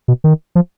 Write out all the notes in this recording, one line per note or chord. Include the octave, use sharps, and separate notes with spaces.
B2
D#3
F3